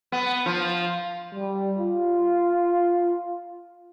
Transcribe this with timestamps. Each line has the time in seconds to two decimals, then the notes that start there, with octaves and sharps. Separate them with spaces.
0.12 B3
0.46 F3
1.35 G3
1.79 F4